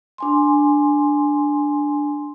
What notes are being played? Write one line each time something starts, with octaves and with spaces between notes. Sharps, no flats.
D4 G#5 C6